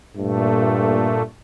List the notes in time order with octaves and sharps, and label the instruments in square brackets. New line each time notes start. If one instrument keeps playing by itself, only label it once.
[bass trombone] G2 [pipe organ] A#2 A3